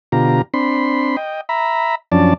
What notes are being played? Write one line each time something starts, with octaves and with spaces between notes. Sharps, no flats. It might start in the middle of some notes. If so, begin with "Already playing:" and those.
B2 D3 F4 G4 A#5
C4 D4 B5 C6
D#5 G5
E5 A#5 B5
F#2 F3 C#4 D4 D5 A5